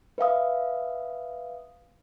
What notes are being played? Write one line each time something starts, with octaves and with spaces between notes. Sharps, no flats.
B4 E5 F5 D#6